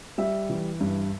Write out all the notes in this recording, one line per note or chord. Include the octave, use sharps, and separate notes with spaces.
G3 E5
E3
G2